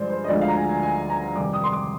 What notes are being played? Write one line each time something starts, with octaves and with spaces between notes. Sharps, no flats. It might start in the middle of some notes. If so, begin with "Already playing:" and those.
Already playing: G2 F3 G#3 C5 D5
C5
D#5
D2 D3 F3 G#3 D5
F5
A#5
G#5
G#5
G#5
A#5
F2 C3 D#3 G3 D6
D#6
C6
D6